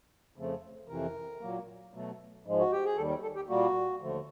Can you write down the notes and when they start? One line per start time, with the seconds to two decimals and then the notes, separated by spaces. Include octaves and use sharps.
0.36 F2 C#3 F3 A3
0.88 F2 C3 E3 A#4
1.41 A#2 F#3 A#3
1.93 B2 F#3 A3
2.45 G#2 F3 G#3
2.59 F#4
2.72 G4
2.84 G#4
2.97 D#2 D#3 G3 A4
3.09 A#4
3.22 A4
3.36 G4
3.49 A#2 G3 A#3 F#4
4.01 D#2 D3 F3 A3